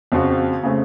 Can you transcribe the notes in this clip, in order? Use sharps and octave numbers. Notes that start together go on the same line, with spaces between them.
F2 C#3 F3 C4 F#4
C#3 A3 C4